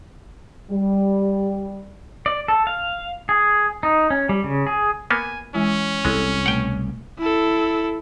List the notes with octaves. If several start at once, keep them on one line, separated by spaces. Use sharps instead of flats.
G3
D5
A4
F5
G#4
D#4
C#4
G3
C#3
G#4
A#3 B3 G#5
E3 G#3 C#4 E4
C2 G#3 E4 A4 C#5
B2 A3 F#5 G5
E4 A4